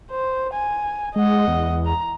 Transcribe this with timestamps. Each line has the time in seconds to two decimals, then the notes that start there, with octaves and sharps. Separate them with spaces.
0.11 C5
0.54 G#5
1.16 G#3 D#5 F#5
1.48 E2
1.86 A#5